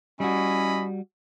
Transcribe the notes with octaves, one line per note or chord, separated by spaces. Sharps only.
G3 C#4 E4 F#4 D#5 B5